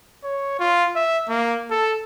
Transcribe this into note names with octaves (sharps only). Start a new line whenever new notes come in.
C#5
F4
E5
A#3
A4